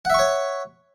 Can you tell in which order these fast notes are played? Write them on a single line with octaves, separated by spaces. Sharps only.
F#5 E5 C#6 C#5